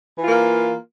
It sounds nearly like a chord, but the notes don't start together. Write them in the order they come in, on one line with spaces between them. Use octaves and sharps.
E3 F4 A#3